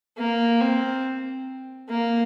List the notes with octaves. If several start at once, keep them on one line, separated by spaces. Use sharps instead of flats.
A#3
C4
A#3